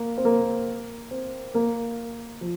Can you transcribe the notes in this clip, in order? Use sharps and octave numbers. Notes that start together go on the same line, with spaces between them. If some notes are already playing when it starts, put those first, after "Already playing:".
Already playing: A#3
C4
A#3
C4
A#3
F3